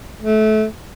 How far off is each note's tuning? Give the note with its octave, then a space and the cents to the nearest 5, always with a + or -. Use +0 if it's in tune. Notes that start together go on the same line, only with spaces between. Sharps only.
A3 -25